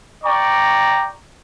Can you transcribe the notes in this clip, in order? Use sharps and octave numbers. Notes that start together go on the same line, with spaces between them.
D5 G5 A#5 C#6